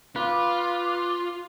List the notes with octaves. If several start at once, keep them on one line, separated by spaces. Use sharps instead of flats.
F4 B4 D6